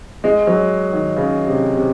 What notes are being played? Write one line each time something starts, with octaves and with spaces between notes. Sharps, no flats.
G#3
F#3
D#3
C#3
C3
C3